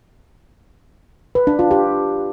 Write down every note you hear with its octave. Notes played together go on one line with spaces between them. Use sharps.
B4
D4
F4
G4